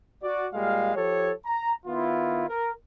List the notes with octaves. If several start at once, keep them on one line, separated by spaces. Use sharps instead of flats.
F#4 D5
A#2 G3 G#3 F5
F3 G4 A4 C#5
A#5
D#3 B3 E4 F4
A#4